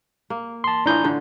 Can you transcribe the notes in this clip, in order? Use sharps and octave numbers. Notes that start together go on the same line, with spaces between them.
A#3
A5 C6
A2 E3 D4 F4 A#5 G6
D3